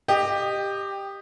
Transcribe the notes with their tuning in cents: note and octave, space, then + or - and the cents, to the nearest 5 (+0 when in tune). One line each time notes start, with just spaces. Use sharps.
G4 +5 D#5 -15